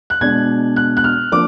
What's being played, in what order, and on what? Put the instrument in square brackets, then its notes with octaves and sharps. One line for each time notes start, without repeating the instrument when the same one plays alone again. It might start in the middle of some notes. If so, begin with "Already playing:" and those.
[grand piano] F#6
B2 G#3 D4 G#6
F#6
F#6
F6
F3 A#3 D4 D6